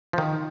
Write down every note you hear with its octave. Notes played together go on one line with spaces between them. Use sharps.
F3
D#3